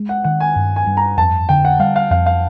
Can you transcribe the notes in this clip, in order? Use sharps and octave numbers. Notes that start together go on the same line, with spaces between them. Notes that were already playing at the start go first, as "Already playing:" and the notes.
Already playing: G#3
F#5
D#3 F#5
G#5
G2
G#5
G2
A#5
F2 A5
D3 G5
F#5
G3 F5
F5
F2 F5
F5